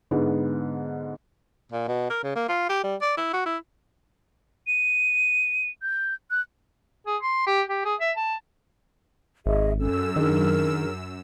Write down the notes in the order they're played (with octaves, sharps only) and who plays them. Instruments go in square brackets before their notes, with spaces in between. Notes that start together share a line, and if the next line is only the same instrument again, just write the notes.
[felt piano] G#2 D3 G#3 B3
[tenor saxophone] A#2
B2
A#4
C#3
A#3
F4
G4
G3
D5
E4
F#4
E4
[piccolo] D#7
G6
F#6
[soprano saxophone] G#4
C6
G4
G4
G#4
E5
A5
[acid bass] G#1 [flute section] G#4 D#5 E5
[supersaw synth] F#2 E6 [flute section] C#4 A4
[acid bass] D#3 [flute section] D4 G#4 A#4